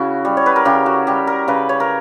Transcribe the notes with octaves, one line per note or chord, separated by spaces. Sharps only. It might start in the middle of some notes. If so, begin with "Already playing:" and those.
Already playing: C#3 E4 F#4
G3
C#5
B4
A#4
C#3 G4
F#4
G3 G4
A#4
C#3 B4
C#5
A#4